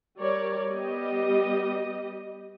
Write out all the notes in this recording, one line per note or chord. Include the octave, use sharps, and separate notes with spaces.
G3 A#4 C#5 D5
G3 B3 G4 D#5